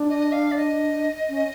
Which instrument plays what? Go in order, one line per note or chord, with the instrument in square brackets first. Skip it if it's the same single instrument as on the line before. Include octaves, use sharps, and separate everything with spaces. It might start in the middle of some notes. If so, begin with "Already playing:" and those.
Already playing: [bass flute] D4
[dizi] D#5
F5
D5
D#5
[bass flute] C#4